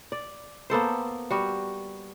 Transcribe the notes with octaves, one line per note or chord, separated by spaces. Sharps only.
D5
A#3 B3 A4 C5
G3 F#4